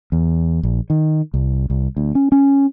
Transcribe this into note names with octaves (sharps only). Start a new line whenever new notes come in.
E2
A#1
D#3
C2
C2
D2
C#4
C#4